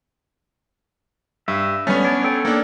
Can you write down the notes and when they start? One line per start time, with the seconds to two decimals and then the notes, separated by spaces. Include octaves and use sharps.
1.48 G2 E5
1.87 G3 A3 B3 C#4
2.04 D4 C#5
2.24 A4 C#5 G5
2.45 A#3 D4